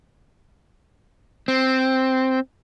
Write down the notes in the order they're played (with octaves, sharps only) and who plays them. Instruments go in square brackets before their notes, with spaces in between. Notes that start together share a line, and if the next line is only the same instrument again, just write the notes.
[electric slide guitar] C4